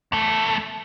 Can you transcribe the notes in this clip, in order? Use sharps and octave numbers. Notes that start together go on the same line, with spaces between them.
E2 A3